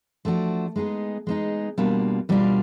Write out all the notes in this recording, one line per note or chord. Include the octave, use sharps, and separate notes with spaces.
F3 A3 D4 F#4
G#3 B3 D#4 G#4
G#3 B3 D#4 G#4
B2 G3 A#3 D4 F4
B2 G3 A#3 D4 F4